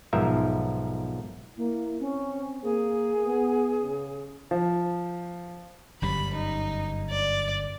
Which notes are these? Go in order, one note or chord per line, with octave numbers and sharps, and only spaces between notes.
B1 G#2 F3 A#4 E5
A#3 E4
C4 C#4
A#3 G#4
B3
C#3
F3
G1 F#2 G3 B5
D#4
D5